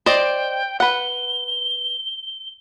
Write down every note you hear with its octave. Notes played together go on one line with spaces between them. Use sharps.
C5 D5 D#5 G5
B4 F#5 G7